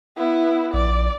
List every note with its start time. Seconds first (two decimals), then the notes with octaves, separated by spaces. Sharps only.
0.17 B3 E4
0.74 A#1 D5